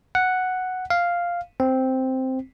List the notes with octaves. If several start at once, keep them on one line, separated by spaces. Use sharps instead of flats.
F#5
F5
C4